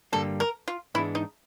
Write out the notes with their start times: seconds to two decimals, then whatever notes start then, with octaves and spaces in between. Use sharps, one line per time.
0.13 G2 D3 G3 A#3 A4
0.40 A#4
0.68 F4
0.94 G#2 E3 G#3 B3 D4 E4
1.15 D#4